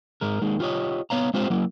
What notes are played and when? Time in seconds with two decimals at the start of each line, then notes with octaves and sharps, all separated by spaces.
0.21 G#2 G#3 A#4
0.42 D#2 D#3 G#3
0.60 F4 G4 A4 C#5 D#5
1.10 B3 C#5 F5 A#5
1.34 G#3 C4 F4 G4 C5
1.50 F#3 A#3 E4